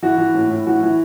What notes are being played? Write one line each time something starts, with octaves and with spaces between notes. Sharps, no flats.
E3 F#4
E3
A2
A2
E3 F#4
E3